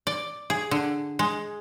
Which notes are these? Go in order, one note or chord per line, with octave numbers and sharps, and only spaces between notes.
D5
G#4
D3
G#3